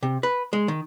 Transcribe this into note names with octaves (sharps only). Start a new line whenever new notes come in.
C3
B4
G#3
D#3